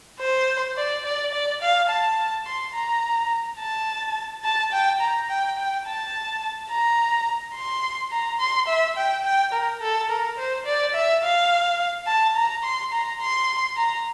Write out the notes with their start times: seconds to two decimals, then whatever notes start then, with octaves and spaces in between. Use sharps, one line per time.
0.20 C5
0.77 D5
1.05 D5
1.33 D5
1.62 F5
1.89 A5
2.46 C6
2.74 A#5
3.59 A5
4.44 A5
4.72 G5
5.01 A#5
5.30 G5
5.57 G5
5.86 A5
6.70 A#5
7.55 C6
8.11 A#5
8.40 C6
8.68 E5
8.97 G5
9.25 G5
9.53 A#4
9.81 A4
10.10 A#4
10.38 C5
10.66 D5
10.94 E5
11.23 F5
12.07 A5
12.35 A#5
12.64 C6
12.92 A#5
13.21 C6
13.77 A#5